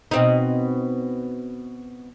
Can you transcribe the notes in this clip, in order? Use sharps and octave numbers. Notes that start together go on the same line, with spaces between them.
B2 C4 D#4